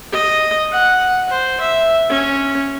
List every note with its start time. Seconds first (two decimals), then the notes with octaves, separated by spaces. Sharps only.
0.12 D#5
0.72 F#5
1.29 C5
1.61 E5
2.09 C#4